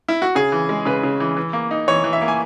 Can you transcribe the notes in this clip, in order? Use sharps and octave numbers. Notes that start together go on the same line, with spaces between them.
E4
F#4
C#3 G#4
E3
G#3
C#3 B4
C#3
E3
E3
A#3
D#4
E3 C#5
E3
E5
A#3
G#5